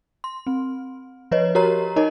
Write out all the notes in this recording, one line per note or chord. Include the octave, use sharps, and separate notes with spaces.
C6
C4
F3 B4 C#5 D#5
F#4 G4 A#4 C#5 A#5
D#4 A#4 C#5 D#5